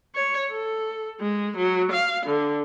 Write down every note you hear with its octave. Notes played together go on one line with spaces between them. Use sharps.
C#5
A4
G#3
F#3
F5
D3